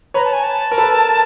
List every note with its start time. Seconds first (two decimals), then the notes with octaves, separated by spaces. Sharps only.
0.14 B4 C#5 A#5
0.25 A5
0.33 G#5
0.43 A5
0.72 A#4
0.78 A4 B4